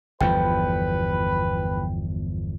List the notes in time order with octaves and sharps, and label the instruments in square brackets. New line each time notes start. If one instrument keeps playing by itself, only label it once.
[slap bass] G1 E2 F3 [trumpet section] B4 [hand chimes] G5